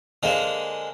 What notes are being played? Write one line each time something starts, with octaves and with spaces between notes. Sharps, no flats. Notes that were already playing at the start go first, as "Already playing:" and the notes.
D3 G#3 A#3 C5